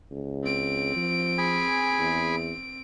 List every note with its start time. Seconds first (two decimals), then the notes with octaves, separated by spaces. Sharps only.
0.11 C#2
0.43 C4 D7
0.96 F3
1.38 G#4 G#5 B5
1.99 E2